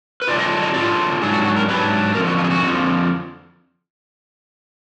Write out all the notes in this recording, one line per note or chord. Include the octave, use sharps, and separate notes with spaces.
B4
D3 F#3 D4 F4 D5
D#5
D#5
D3 F#3 D4 F4 D5
G#2 F#3 D4 G#4
F#4
F#4
A#4
G#2 F#3 D4 B4
F2 D3 F3 A#4
F#4
F4
G#4
F#4
F2 D3 F3